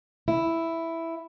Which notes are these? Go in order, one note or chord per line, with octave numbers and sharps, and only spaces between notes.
E4